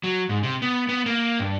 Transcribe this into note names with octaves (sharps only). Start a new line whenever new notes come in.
F#3
G#2
C3
B3
B3
A#3
G2